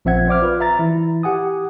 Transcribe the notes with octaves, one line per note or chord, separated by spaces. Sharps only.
A#1 F3 C4 E5 F#5 G#6
C5 D5 D6 F6
F4 B4
E5 A#5 A6
E3 E4
G4 F#5 G#5 D#6